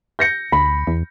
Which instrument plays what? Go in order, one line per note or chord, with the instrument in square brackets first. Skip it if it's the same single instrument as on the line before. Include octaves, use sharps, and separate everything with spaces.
[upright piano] G6 A#6 C#7
[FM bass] D2 [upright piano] B5
[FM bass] E2